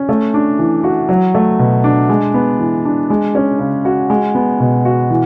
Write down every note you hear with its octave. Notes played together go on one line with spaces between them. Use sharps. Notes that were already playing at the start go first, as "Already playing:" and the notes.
Already playing: C#4
A3
D4
E3
F#4
F#3
A3
B2
D4
G#3
B3
E3
D4
G#3
C#4
C#3
F#4
G#3
B3
B2
F#4
E3